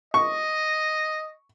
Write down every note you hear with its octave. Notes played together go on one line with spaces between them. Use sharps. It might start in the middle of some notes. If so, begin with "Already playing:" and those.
D#5 C#6